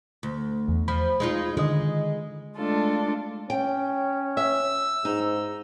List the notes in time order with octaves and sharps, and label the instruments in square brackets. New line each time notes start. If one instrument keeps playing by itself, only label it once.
[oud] D2
[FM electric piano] E2
[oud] F3 [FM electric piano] B5
[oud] G#3 D#4 F4
[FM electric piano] D3 D#3 D#5 [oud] G#3
[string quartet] G#3 A3 D4 F4 A4
[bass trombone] C#4 [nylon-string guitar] G5
[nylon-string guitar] E5 [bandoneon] E6
[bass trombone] G#2 [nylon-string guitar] D#4